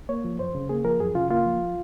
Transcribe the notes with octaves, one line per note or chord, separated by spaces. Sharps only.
A#3 C#5
F3
F#2 C5
C#3
A#3 G#4
F3 A#4
F#2 G#4
C#3 F4
A#3 F4
F3